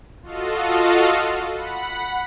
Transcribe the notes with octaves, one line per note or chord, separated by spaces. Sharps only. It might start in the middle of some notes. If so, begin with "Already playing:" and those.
F4 F#4 A4 D#5 F5
F#5 B5